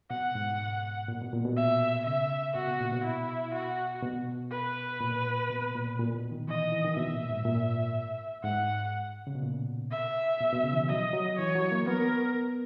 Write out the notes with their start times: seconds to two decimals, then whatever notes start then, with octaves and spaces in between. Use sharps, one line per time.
0.10 B2 F#5
0.35 G#2
1.08 A#2
1.21 B2
1.33 A#2
1.45 B2
1.57 E5
2.06 C#3 E5
2.55 B2 F#4
2.67 B2
2.80 A#2
2.93 B2
3.04 E4
3.54 F#4
4.03 B2
4.51 B4
5.01 A#2
5.50 B2
5.75 A#2
6.00 A#2
6.15 B2
6.31 D#3
6.48 E3 D#5
6.72 E3
6.85 D#3
6.96 B2 E5
7.13 A#2
7.29 G#2
7.45 A#2
8.44 G#2 F#5
9.27 C#3
9.35 B2
9.42 A#2
9.91 E5
10.41 B2
10.53 B2
10.64 C#3
10.72 E3
10.78 D#3
10.89 F#3 D#5
11.13 F#3
11.39 E3 C#5
11.55 F#3
11.72 A#3
11.87 B3 A#4